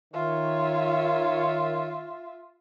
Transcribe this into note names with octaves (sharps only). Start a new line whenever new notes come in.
D#3 F4 C#5 E5